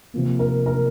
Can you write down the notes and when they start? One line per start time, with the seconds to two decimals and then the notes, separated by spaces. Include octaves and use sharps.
0.14 C3 F3 A#3
0.39 A#4
0.66 A#4